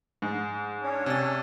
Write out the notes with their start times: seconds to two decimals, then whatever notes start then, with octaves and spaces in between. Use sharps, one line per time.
0.22 G#2
0.82 C#4 D4 C#5
1.06 C3 A6